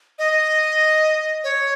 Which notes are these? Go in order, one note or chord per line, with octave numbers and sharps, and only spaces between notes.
D#5
C#5